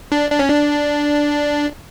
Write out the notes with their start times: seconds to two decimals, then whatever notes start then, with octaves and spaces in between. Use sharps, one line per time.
0.12 D4
0.31 D4
0.39 C#4
0.48 D4